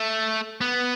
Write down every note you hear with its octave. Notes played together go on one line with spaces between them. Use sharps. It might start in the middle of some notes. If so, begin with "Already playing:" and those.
Already playing: A3
B3